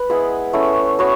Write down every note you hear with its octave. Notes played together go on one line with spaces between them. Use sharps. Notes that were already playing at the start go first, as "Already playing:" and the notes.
Already playing: B4
G#3 B3 E4 G#4
A3 C#4 E4
B3 F#4 C#5